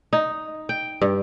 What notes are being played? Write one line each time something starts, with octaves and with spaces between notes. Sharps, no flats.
D#4
G5
G2